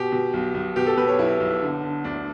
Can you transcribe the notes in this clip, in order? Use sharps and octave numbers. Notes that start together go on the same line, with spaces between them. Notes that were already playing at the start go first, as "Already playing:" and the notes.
Already playing: B2 G4
B2
B1
B1
B2 G4
A4
B2 B4
C#5
B1 E4
B1
D3
D3
D2 D4